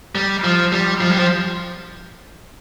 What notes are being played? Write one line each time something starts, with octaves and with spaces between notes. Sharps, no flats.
G3
F3
G3
F3
G3
F3